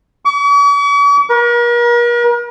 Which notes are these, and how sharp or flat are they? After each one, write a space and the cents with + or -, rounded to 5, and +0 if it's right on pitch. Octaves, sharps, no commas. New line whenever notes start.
C#6 +45
A#4 +40